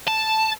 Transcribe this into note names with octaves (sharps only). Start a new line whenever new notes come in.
A5